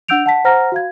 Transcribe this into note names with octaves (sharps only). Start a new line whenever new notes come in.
D4 F#5 E6 G6 D7 F7
F#5 A5 B6
C5 F#5 A#5 F6 A#6
F#4 F5 G#6